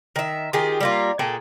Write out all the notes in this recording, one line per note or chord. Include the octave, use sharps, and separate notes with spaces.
D#3 E5
D#3 F4 G4 G#4
G3 A#3 F4
A#2 G#4 A4 G5